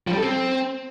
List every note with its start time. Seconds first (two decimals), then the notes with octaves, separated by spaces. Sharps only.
0.07 F3
0.12 G3
0.17 A4
0.23 C4